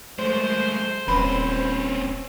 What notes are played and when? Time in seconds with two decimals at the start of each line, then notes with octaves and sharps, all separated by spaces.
0.19 G#3 A3 C5
1.08 D#1 C4 C#4 B4